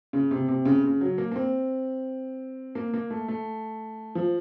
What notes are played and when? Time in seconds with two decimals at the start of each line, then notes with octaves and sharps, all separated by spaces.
0.13 C#3
0.31 C3
0.49 C3
0.65 C#3
0.83 C#3
1.01 F#3
1.18 A#3
1.32 A#3
1.36 C4
2.75 A#3
2.94 A#3
3.10 A3
3.28 A3
4.15 F3